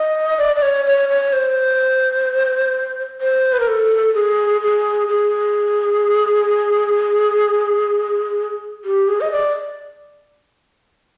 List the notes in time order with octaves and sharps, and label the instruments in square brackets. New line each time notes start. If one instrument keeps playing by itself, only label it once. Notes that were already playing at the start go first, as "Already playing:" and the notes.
Already playing: [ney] D#5
D5
D5
C#5
C#5
C#5
C5
C5
B4
A#4
A4
G#4
G#4
G#4
G4
G#4
D#5
D5